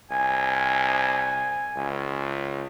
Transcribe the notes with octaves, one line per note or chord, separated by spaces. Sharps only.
C2 G#5
C#2